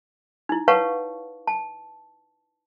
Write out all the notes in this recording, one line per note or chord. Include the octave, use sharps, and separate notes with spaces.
D#4 E4
B4 C#5 F5 F#5 A5 C#6
A5